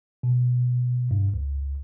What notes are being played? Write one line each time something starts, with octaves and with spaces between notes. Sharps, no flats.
B2
G2
C#2